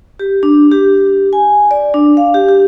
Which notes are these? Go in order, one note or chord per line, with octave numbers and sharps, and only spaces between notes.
G4
D4
G4
G#5
D5
D4
F5
G4
G4